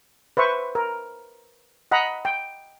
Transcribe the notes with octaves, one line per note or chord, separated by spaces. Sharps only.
B4 C5 E5 C#6
A#4
D#5 F#5 A#5 B5
G5